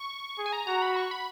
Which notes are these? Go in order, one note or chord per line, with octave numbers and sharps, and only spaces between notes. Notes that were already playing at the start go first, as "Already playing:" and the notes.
Already playing: C#6
G#4
G#5
A#5
F#4 A#5
B5
C#6
B5